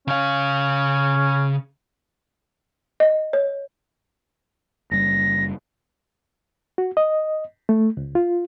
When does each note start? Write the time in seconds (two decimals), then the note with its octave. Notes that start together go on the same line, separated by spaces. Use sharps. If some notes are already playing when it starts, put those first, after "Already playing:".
0.08 C#3 C#4 F5
3.00 D#5
3.33 C#5
4.91 F#1 G3 A#6
6.78 F#4
6.97 D#5
7.69 A3
7.97 C#2
8.15 F4